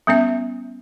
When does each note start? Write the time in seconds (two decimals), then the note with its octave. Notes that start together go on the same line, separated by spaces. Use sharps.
0.07 G3 B3 C#4 E5